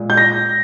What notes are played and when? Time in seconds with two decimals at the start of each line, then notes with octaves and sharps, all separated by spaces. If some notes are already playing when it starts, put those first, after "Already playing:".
Already playing: A#2 G#3
0.10 G6
0.17 A#6